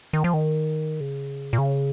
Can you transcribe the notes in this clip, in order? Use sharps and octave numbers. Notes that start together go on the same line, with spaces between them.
D#3
F3
D#3
C#3
A#2
C#3